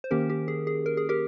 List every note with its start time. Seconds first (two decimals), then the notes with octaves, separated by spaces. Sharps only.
0.04 C5
0.11 D#3 A#3 C#4 G4 A#4
0.30 G4
0.48 G#4
0.67 G#4
0.86 A#4
0.97 G#4
1.09 G4 A#4